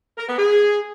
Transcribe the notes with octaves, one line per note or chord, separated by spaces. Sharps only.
A#4
B3
G#4